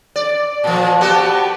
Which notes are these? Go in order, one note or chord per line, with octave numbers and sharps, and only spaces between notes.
D5
A#2 F3 A5
B3 F#4 G4 A5